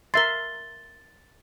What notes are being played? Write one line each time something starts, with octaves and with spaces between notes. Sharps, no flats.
A#4 E5 C6 A6 G7